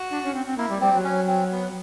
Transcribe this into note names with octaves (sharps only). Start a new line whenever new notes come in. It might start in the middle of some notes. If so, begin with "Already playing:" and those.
Already playing: F#4
D4
C#4
C4
C4
A#3 E4
G3
G3 C4
F#3
C#4
C4
B3